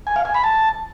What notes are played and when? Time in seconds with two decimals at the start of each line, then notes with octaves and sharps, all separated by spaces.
0.07 G#5
0.16 F5
0.25 G#5
0.34 B5
0.44 A5